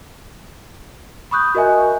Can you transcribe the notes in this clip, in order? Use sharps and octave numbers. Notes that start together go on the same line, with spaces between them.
B5 C#6 D#6 F#6 G6
F#4 A#4 D#5 E5 G#5